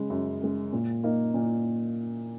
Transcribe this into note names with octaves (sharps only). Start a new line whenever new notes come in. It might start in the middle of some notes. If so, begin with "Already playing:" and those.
Already playing: C#3 G#3
F#2
C#3 G#3
A#2
A#3 D#4
A#2